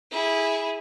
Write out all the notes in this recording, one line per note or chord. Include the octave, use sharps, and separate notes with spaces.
E4 G#4